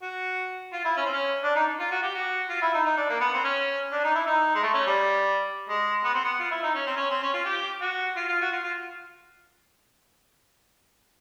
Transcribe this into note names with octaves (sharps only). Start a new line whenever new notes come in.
F#4
F4
E4
C#4
C4
C#4
D4
D#4
F4
F#4
G4
F#4
F4
E4
D#4
D#4
D4
A#3
B3
C4
C#4
D4
D#4
E4
D#4
G#3
A3
C#4
G3
G#3
B3
C4
B3
F4
E4
D#4
C#4
C4
C#4
C4
C#4
F4
G4
F#4
F4
F4
F#4
F4
F4